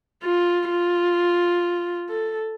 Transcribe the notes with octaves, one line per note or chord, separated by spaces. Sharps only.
F4
F4
A4